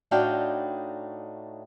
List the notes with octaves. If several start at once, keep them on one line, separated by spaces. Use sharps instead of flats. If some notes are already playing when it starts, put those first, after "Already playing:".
A2 D4 D#4 F#4 F5 G5